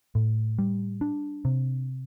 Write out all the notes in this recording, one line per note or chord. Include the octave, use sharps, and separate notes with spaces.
A2
G3
D4
C3